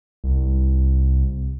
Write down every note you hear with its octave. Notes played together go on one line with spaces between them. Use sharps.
C2